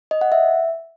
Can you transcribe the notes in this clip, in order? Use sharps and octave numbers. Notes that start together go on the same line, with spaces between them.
D#5
F#5
E5